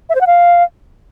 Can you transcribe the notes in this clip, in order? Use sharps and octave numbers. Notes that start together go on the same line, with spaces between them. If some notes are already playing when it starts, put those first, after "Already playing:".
E5
C5
F#5
F5